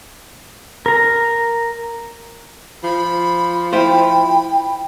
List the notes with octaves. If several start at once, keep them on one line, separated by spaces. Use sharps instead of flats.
A#4 A#5
F3 B5
E4 F4 C5 G5 B5